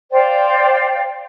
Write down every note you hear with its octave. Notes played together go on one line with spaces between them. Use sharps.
C5 D5 F5 G5